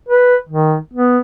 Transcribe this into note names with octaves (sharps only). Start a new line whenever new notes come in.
B4
D#3
B3